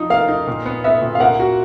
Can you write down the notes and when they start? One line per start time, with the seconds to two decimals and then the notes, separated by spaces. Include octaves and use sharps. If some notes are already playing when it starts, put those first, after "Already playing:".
Already playing: F3 D#4
0.10 A#3 F5
0.28 D#4
0.47 A#2
0.66 B3
0.84 B3 E5
1.02 A#2
1.15 F5
1.20 A#3 F#5
1.40 F#4